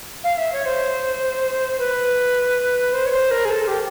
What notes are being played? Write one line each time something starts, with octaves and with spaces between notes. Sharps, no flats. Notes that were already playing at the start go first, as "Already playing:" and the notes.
F5
E5
C#5
C5
B4
C5
C#5
C5
A#4
G#4
A4
G4